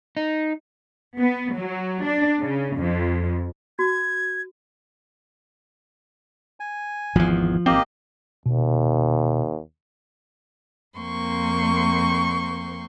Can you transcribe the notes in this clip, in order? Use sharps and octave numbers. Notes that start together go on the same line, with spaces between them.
D#4
B3
F#3
D4
C#3
F2
F#4 G#6
G#5
G#1 E2 F3
G#1 A#3 C4 G4 D#5
D#2 B2
F2 A#3 C4 C6 C#6